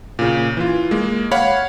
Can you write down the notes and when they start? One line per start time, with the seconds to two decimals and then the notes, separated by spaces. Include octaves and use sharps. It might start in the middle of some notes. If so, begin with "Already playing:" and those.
0.19 A#2 C#3
0.57 E3 F4
0.91 G#3 A#3
1.31 C#5 F5 F#5 B5